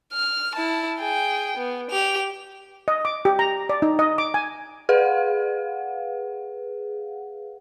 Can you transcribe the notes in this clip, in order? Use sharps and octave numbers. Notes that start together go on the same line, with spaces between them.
F6
E4 A5
G#4 G5
B3
G4 F7
D#5
D6
G4
A#5
D5
D#4
D#5
D6
G#5
G#4 B4 F5 F#5